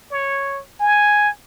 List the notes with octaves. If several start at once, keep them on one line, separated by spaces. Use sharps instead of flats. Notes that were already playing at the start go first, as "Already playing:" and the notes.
C#5
G#5